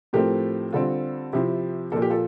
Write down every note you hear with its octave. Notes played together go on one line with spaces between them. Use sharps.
A2 F3 A3 C4 G4 A#4
D3 G3 C4 F4 A4
C3 F3 C4 E4 G4
A#2 F3 A#3 A4
G4
F4 A4